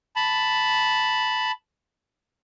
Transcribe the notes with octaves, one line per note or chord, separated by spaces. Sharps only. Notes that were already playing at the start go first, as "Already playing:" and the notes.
A5 B5